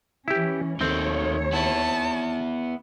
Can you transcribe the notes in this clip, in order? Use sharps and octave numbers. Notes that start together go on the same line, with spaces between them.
E3 C#4 E4 G4
D#2 D#3 A3 C4 C#5
B3 E4 A5